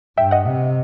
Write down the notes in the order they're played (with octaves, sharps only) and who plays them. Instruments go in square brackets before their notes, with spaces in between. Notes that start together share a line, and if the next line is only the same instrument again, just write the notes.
[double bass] G2 [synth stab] E5 G5
[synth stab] D#5 F#5
[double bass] C3